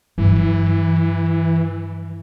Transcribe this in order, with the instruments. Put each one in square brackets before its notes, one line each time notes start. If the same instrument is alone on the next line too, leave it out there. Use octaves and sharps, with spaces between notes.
[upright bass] G2 F#3 [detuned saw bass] E3